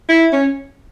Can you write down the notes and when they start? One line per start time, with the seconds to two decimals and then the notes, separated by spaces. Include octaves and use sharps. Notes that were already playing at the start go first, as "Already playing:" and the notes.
0.09 E4
0.33 C#4